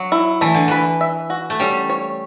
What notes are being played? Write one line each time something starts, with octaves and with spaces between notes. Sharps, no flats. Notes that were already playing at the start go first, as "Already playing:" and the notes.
Already playing: F#3
E4
E3 A3
D3
E3 B4
E5
F#4
A3
G3 C#4
C#5